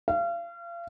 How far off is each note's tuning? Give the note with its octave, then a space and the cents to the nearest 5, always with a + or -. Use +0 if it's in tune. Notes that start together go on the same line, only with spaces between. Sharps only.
F5 -35